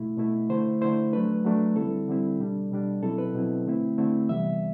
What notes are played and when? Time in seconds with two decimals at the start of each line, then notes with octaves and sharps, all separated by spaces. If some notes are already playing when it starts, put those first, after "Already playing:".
Already playing: B2 A3 E4
0.18 B2 A3 E4
0.49 D3 A3 E4 C5
0.81 D3 A3 E4 C5
1.13 F#3 A3 D4 B4
1.45 F#3 A3 D4
1.76 D3 G3 C4 E4 A4
2.08 D3 G3 C4 E4
2.39 B2 G3 D4
2.71 B2 G3 D4
3.03 B2 F#3 C4 E4 A4
3.18 B4
3.35 B2 F#3 C4 E4
3.66 D3 A3 C4 E4
3.98 D3 A3 C4 E4
4.29 C3 E3 G3 B3 E5